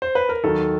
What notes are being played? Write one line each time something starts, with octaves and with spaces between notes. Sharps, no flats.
C5
B4
A#4
D#2 D#3 F#3 A4